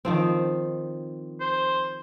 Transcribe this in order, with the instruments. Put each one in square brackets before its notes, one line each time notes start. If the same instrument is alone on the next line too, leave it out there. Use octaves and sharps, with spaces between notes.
[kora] D#3 F3 C4
[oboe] C5